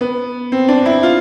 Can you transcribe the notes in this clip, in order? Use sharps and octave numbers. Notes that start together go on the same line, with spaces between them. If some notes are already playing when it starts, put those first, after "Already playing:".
B3
C4
D4
E4
F4